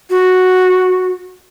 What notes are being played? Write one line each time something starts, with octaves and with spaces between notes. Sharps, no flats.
F#4